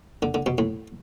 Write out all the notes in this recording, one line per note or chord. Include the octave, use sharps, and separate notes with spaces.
D3
D3
B2
A2